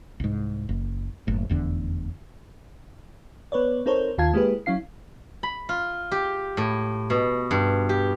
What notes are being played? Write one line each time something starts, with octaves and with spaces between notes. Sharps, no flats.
C2 G#2
F#1
F#1 A2
F1 E2 D3
B3 B4 C#5 D5
C4 D#4 A4 A#4 C5 C#5
D#2 D#3 F4 F5 A5 G#6
G#3 A#3 E4 G4 G#4 B4
F#3 C#4 E4 F5 C7
B5
F4
G4
A2
B2
G2
G4